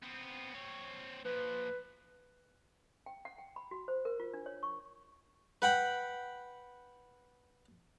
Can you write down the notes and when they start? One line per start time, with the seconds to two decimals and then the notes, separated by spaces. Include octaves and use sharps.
0.03 B3 C4
0.54 C4 C#5
1.25 A#2 F3 B4
3.06 G5
3.25 F#5
3.38 G5
3.56 B5
3.71 F#4
3.88 C5
4.05 A#4
4.20 F4
4.34 D4
4.46 C#5
4.63 C#6
5.62 B4 F#5 G5 B5